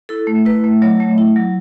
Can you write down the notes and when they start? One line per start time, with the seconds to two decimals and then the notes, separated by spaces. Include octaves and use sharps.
0.09 E4 A4
0.27 A3
0.45 E4 B4
0.64 A3
0.82 F#3 C#5
1.00 A3
1.18 E4
1.36 F#3